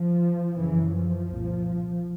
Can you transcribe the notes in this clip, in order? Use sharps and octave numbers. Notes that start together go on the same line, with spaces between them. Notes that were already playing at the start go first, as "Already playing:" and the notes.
Already playing: F3
F#2 C#3 E3
F3
C2
A#2